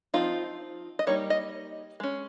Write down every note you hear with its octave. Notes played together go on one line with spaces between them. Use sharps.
F3 C4 D#4 F4
D#5
G3 A#3 D#4 C#5
D#5
G#3 C#4